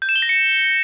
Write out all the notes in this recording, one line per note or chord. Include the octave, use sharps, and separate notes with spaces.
G6
E7
G7
A#6
C#7